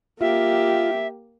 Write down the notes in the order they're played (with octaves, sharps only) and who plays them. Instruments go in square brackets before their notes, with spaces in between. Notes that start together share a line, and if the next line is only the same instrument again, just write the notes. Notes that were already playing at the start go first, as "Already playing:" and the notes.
[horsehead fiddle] A#3 G4 [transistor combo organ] F4 [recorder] E5